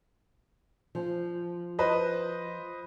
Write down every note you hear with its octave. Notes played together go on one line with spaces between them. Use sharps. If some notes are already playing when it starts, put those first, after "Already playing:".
F3
B4 C5 D#5